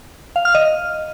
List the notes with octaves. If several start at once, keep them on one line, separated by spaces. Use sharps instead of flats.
F5
F6
D#5